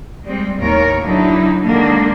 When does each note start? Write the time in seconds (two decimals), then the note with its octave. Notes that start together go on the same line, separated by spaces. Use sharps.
0.24 G3 G#3 C4
0.59 D#2 A2 A#4 C#5
1.02 D3 F#3 D#4 E4
1.63 D3 D#3 G#3 A#3 D4